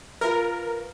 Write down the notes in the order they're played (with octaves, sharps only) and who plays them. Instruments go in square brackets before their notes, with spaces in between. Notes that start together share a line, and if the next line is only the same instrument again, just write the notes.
[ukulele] F4 B4 [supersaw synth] A#4